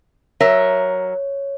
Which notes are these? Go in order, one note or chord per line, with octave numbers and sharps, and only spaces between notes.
F#3 A#4 C#5 E5